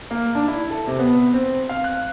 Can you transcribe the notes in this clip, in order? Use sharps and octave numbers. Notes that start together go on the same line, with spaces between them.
A#3
D4
E4
A4
C3
B3
C4
F5
F#6